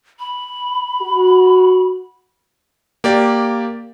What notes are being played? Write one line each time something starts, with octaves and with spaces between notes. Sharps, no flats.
B5
F#4
A#3 G4 D5